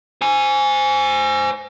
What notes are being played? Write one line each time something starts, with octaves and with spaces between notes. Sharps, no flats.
C5 G#5